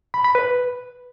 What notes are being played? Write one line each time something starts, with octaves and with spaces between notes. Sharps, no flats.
B5
B5
B4